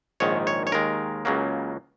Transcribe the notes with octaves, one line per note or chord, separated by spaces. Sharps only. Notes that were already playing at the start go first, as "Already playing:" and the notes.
A#1 G#2 D#3 C#5
C#5
C#5
D#2 D#3 G#3 A#4
C#2 C#3 F#3 A#3